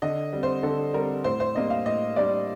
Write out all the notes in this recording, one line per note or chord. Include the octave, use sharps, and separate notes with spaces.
D3 D#5
G3 C4
C5
D3 A4
G3 C4 A#4
A2 C5
C5
G3 A#3 D4 D#5
F5
A2 D#5
G3 A#3 D4 D5